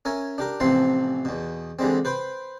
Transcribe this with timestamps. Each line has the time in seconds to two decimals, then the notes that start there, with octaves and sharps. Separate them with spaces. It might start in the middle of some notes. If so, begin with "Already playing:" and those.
0.05 C#4 A#4 E5 G#5
0.38 D4 G4 A#4
0.60 A1 C3 E3 F3 C4 C6
1.25 E2 B2
1.79 D3 E3 G3 G#3 C4
2.05 B4 C5 G5 B5